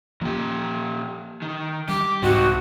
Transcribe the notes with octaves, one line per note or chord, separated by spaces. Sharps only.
A#2 F3 G4
D#3
G3 G4 D6
C2 G#2 C4 D#4 F#4